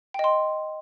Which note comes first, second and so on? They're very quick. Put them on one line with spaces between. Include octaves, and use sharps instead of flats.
G5 D#5 C6